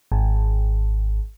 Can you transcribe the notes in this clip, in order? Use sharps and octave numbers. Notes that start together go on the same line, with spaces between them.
G#1